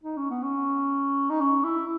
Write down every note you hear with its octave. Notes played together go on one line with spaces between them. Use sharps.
D#4
C#4
B3
C#4
D#4
C#4
E4